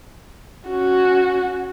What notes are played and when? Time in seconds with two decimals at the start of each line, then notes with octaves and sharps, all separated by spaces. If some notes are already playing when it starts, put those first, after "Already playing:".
0.67 C#4 F#4